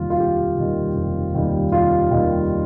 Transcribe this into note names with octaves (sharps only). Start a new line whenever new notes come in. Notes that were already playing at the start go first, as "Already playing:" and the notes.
Already playing: F1 D#2 D#3 G3 F4
F4
F1 G4
D#2 D#3 G3
F1
D#2 D#3 G3
F1 F4
D#2 D#3 G3